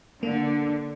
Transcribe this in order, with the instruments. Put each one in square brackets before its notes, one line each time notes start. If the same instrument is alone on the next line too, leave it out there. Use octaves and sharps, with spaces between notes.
[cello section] D3 [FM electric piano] A#3